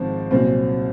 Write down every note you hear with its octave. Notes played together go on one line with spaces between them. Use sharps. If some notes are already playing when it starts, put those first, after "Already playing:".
Already playing: G#1 G#2 F3 C4 C5
C2 A#2 F#3 C4 C5